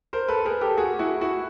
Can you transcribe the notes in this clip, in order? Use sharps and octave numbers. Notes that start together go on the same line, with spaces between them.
A#4 C5
A4 B4
G#4 A#4
G4 A4
F#4 G#4
E4 F#4
E4 F#4